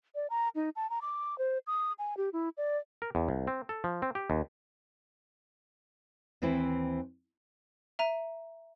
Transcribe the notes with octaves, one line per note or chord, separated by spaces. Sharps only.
D5
A#5
D#4
A5
A#5
D6
C5
D#6
G#5
G4
E4
D5
A#4
E2
C2
C4
A4
F3
C4
G4
D#2
D#2 E3 C4 E4 B4 C5
E5 A#5 D#7